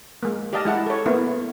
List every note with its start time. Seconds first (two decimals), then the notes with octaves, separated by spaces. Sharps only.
0.23 G#3 A#3
0.53 G4 D5 D#5 F5 A5
0.65 G#3 E4 F#5 A5
0.86 A4 C#5
1.06 A#3 B3 E4